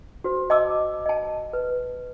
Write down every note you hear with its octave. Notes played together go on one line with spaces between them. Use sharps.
F#4 C5
D#5 A5 D6 E6
D#5 A5
B4